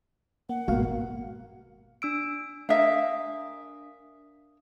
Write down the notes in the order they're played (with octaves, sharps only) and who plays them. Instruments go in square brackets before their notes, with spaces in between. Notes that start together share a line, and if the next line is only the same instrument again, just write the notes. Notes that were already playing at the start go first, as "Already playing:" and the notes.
[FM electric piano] A#3 [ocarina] F#5
[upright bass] G#1 [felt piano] B2 A#3 [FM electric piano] F#4 F5
[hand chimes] D4 E6 D7
[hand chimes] D4 D#6 [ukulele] A#4 E5 F5